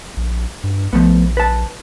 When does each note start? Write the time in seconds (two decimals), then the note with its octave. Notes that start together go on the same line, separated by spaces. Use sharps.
0.17 A#1
0.64 G2
0.93 A#1 F3 A3 B3
1.37 B4 A5